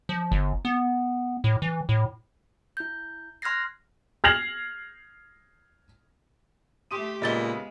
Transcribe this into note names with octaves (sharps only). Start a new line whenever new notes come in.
F3
G1
B3
A2
E3
A2
E4 G6
C6 F6 F#6 G#6 A#6 C7
F6 G#6 A#6 C7 F7 F#7
A3 G4 C6 D#6 D#7
A#2 C#3 G#3 B3 D#5 E5 A6 G7